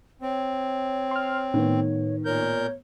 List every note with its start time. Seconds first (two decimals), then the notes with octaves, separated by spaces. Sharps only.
0.22 C4 C#5
1.11 C6 F6
1.54 A2 D#3 B3
2.25 A#2 A#4 C#5 G6